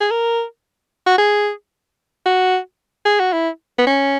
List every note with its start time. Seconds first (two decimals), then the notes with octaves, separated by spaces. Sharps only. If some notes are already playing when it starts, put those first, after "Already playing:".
0.01 G#4
0.11 A#4
1.07 F#4
1.18 G#4
2.26 F#4
3.06 G#4
3.20 F#4
3.33 E4
3.79 B3
3.87 C#4